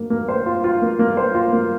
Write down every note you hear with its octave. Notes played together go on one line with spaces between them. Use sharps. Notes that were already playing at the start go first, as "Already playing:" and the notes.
Already playing: A#3
A#3
C5
F4
F4
A#3
A#3
C5
F4
A#3